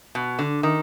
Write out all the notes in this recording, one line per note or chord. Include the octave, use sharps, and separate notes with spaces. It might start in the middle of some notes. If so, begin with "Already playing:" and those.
B2
D3
D#3